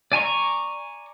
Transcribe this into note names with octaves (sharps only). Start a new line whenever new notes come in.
D5 G#5 A#5 C#6